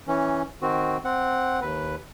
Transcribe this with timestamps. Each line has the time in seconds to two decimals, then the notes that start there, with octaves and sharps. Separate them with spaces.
0.08 E3 C#4
0.62 D#3 C4 F#4
1.05 C4 F#5
1.61 D#2 B4